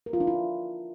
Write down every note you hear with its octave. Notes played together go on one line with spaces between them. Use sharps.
A#4
F4
D4
E4